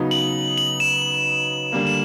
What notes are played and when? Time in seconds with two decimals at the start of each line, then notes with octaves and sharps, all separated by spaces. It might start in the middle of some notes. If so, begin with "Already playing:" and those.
Already playing: C#3 F#3 B3 D#4
0.11 F#7
0.58 F#7
0.80 E7
1.72 D3 G3 A#3
1.87 E7